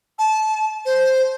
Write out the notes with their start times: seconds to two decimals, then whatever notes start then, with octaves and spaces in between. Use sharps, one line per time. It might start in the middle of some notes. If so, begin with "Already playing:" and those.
0.19 A5
0.85 C5